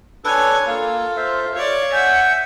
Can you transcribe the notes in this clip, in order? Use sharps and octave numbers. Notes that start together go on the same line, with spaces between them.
D4 A4 B4 C#5 G#5
A#3 F4 A4
C5 E5 F5
C#5 D5 F5
E5 F#5 G#5 G6